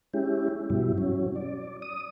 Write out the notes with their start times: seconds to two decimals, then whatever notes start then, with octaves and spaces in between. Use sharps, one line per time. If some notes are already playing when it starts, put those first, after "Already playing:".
0.14 G#3 C#4 E4 G4
0.70 G2 B2 F#3 G3 E4
0.98 F#3 C#4
1.36 D5
1.82 D#6